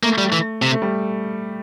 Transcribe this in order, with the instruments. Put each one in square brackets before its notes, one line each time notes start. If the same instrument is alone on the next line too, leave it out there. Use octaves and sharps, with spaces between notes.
[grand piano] A3 [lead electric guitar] A#3
[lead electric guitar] G3
E3
C3
[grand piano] A3
G3